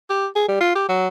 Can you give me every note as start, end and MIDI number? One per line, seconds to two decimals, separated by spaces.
0.10 0.27 67
0.35 0.47 68
0.48 0.59 55
0.60 0.73 65
0.75 0.88 67
0.89 1.08 54